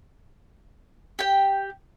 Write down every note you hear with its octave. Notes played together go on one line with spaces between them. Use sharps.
G4 G5